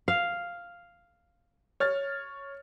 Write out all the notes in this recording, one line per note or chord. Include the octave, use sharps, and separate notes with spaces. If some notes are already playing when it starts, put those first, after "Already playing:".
F5
C#5 F6 A6